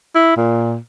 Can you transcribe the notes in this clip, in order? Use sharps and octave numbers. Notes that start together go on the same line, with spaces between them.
E4
A#2